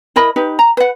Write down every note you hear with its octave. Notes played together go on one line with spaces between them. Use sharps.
E4 A#4 D#5 B5
D#4 G4 B4
A#5
B4 F#5